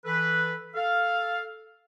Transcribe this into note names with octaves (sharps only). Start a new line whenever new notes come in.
E3 A4 B4
A4 F5